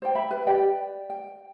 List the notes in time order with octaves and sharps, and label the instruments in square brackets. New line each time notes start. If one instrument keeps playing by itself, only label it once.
[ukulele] C5 D5 G5
E5 B5
B4
G4 D5 G5
G5